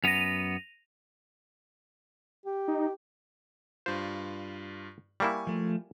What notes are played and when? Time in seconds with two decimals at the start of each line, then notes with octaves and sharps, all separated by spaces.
0.04 F#2 B3 A#6 D#7 F7
2.46 G4
2.68 D#4
3.86 G2 F4 C5
5.20 G3 A#3 E4 G#5 C#6
5.47 F3 A3